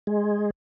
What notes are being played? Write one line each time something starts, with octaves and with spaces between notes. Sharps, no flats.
G#3